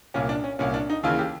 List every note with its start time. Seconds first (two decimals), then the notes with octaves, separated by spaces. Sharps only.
0.14 C2 A#2 C#4
0.29 D4
0.44 C#4
0.59 C2 A#2 C#4
0.74 D4
0.90 D#4
1.03 D#2 C#3 E3 F4
1.19 G4